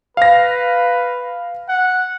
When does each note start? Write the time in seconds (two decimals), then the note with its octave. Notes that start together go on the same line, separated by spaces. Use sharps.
0.17 B4 F5 A#6
1.69 F#5